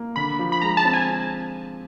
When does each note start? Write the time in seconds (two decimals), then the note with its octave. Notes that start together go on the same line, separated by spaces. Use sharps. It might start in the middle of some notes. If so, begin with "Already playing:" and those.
Already playing: A#3
0.16 D3 B5
0.39 F3
0.52 B5
0.62 G#3 A#5
0.77 A5
0.85 C4
0.93 G#5